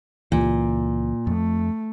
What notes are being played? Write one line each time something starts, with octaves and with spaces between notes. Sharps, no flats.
C#2 A#2 E3
F2 A3